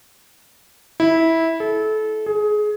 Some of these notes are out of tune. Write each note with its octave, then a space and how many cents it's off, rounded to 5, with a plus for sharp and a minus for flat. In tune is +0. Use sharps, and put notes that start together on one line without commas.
E4 -15
A4 -30
G#4 +20